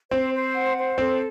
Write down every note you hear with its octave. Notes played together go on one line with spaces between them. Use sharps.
C4 C5
C5
F#5
C5
C4 A4